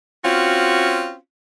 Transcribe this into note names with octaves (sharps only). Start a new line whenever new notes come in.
C4 C#4 F4 F#4